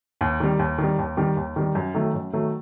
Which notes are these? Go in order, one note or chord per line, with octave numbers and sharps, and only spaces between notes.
D#2
D#3 G3
D#2
D#3 G3
D#2
D#3 G3
D#2
D#3 G3
F#2
D#3 F#3 A3
F#2
D#3 F#3 A3